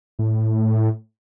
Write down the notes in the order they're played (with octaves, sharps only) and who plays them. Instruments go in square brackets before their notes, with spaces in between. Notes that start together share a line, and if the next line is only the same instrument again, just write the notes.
[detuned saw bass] A2